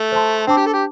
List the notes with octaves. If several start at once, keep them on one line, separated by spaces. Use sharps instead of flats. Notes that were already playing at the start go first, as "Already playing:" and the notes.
Already playing: A3
C5 A5 C6
C4 D4 C5 A5 D6
G4
A4
G4